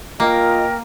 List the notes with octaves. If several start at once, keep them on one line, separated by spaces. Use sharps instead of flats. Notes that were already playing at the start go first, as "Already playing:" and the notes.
A#3 F4 A#4 D#5 G5